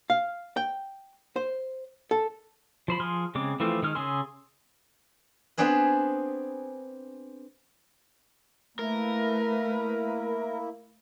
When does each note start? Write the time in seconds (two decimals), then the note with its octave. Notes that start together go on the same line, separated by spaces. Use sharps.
0.10 F5
0.57 G5
1.36 C5
2.11 A4
2.88 F3 C5 B5
3.00 F3 G#4 C6 F6
3.35 C#3 G#3 C4 D6
3.60 E3 F3 A3 C4 F4
3.83 D#3 G#3 F6
3.95 C#3 G#4 G#5 C6 E6
5.58 B3 C4 D4 G#4 B4
8.79 A3 A#3 E4 A#4 B4